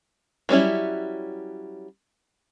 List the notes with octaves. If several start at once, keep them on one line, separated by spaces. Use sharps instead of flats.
F#3 G3 C#4 E4